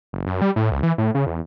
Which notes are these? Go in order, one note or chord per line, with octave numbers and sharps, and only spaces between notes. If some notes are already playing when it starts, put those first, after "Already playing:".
F#1
F#2
G3
A2
C#2
E3
A2
C#3
E2